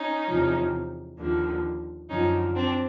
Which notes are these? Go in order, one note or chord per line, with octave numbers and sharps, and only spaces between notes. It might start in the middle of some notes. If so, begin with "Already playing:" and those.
Already playing: C#4 D#4
E2 C3 F3
D#2 D3 F3
F#2 D3 F3 C#4 D#4
C4 D4